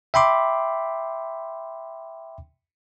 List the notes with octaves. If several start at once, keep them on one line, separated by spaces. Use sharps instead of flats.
E5 G5 B5 C6 D6